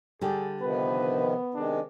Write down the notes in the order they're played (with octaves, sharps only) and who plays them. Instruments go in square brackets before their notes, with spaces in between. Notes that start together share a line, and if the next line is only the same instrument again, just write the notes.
[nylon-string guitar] D3 G3 G4 [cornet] G#4
[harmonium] C3 D#3 F3 [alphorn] B3 [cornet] B4
[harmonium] C3 D#3 G#3 [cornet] D4